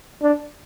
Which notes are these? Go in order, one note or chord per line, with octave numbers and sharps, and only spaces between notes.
D4